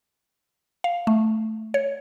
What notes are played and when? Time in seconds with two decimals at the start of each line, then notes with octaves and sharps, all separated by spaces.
0.84 F5
1.07 A3
1.74 C#5